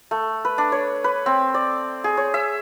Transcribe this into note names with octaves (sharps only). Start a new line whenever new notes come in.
A3
B4
D4
C#5
B4
C4
D5
G#4
C#5
E5